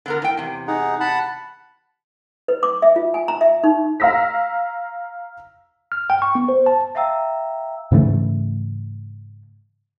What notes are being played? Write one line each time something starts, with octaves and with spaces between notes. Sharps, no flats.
D3 B3 A#4
A2 G5
E2 C3
D#4 G#4 F#5
F#5 A5 B5
B4
D6
E5
F4
G#5
A#5
E5
D#4
F5 A#5 E6 A#6 B6
F6
G5
C#6
B3
C5
A5
E5 F5 G5 A#5 E6
G#2 C#3 E3 A3